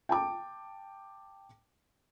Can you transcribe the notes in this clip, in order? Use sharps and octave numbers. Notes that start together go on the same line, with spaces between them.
G5 A5 D6